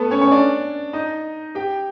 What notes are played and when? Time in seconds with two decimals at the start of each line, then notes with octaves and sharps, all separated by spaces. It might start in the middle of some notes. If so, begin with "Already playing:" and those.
Already playing: A3 B3 A4 B4
0.11 C#4 C#5
0.21 C#4 C#5
0.31 D4 D5
0.93 D#4 D#5
1.55 G4 G5